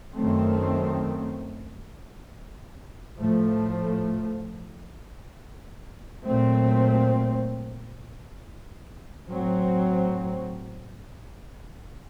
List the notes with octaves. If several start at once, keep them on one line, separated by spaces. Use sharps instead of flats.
F#2 D#3 A3 C4
A2 F3 A3
A#2 F#3 A3 C4
A2 F#3 C4